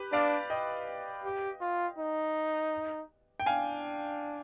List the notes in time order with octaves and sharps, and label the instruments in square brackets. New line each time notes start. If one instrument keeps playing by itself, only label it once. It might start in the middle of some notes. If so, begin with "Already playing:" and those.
Already playing: [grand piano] G4 B4
[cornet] D4 [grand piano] D5 F5
[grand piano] D#5 G5
[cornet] G4
F4
D#4
[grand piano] G5
[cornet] D4 [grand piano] F5 G#5